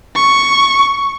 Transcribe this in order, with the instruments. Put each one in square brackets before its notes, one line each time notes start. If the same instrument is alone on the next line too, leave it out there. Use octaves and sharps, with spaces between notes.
[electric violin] C#6